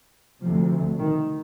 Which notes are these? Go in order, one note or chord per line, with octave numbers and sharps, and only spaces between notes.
D2 C3 F3
D#3